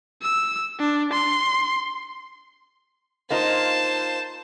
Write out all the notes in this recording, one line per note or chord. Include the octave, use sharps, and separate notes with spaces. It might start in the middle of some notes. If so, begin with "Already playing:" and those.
E6
D4
C6
A#3 D#4 F4 C5 A5